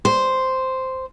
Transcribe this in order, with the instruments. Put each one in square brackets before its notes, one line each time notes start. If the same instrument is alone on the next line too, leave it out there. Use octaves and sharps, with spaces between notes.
[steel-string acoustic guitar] C5